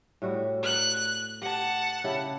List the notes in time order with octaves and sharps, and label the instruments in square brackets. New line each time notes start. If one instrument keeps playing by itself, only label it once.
[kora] A2 G3 F#4
[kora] D5 F#5 [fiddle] F#6
[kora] G4 [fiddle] F#5 A5
[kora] C#3 E4 G4